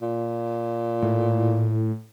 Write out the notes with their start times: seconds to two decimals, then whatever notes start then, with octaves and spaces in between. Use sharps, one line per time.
0.01 A#2
1.02 A2